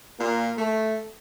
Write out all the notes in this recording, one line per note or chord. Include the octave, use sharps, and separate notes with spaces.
A#2
A3